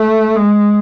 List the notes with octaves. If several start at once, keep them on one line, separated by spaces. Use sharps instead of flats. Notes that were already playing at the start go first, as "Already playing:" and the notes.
Already playing: A3
G#3